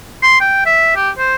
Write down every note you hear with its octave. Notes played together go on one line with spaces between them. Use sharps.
C6
G5
E5
G4
C5